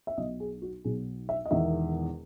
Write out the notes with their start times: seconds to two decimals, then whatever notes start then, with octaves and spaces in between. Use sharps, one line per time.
0.07 E5
0.17 B1 B2 F#3 D#5
0.40 G#4
0.62 F#4
0.84 B1 B2 F#3 G#4
1.29 E5
1.45 D#5
1.51 E1 E2 D#3 E5